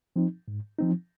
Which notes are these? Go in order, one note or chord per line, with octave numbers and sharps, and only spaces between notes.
F3 C4 D#4
G#2
F3 C4 D#4